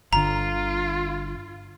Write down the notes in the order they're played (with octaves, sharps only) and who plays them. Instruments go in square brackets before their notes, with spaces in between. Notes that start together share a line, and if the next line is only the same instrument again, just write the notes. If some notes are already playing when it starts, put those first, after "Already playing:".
[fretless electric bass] G1 D3 [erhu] F4 [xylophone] A#5